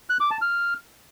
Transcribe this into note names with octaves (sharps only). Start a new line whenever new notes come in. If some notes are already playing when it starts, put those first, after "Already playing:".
F#6
D6
A5
F6